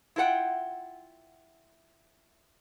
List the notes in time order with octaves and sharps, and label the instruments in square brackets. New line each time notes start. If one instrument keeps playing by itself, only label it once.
[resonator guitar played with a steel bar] E4 F4 A#4 F#5 G5